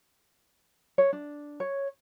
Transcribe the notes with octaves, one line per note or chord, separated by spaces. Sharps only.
C#5
D4
C#5